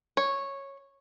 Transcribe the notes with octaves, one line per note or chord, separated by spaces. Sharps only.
C#5